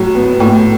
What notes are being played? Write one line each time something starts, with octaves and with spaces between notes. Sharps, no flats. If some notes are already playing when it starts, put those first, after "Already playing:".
Already playing: A2 F#3
B3
A2